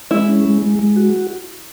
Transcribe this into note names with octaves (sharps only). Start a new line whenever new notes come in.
G#3 E4
C#4
G#3
G#3
G#3
F#4